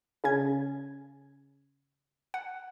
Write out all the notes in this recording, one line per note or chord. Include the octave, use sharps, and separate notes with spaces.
C#3 C#4 G#6
F#5